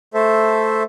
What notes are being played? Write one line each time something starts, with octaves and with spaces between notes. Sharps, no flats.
A3 A4 C5 E5